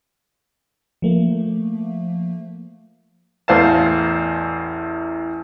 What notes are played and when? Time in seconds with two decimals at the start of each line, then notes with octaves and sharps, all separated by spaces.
1.02 F3 A3 A#3
3.48 A1 E2 C5 F5 A5